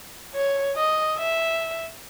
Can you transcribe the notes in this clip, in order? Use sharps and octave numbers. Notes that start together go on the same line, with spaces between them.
C#5
D#5
E5